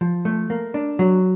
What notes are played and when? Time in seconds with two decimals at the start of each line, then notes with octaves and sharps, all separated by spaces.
0.01 F3
0.25 A3
0.50 A#3
0.74 D4
0.99 F#3